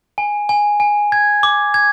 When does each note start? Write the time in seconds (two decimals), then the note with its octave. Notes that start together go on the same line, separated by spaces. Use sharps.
0.18 G#5
0.49 G#5
0.80 G#5
1.12 G#6
1.43 D6
1.74 G#6